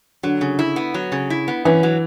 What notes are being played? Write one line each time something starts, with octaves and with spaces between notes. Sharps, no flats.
D3 F#3
C#3
E4
B3
F#3
C#3
E4
B3
E3 C#4
F#3